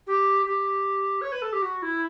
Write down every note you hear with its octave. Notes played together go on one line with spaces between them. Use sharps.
G4
G4
C#5
B4
A4
G4
F#4
E4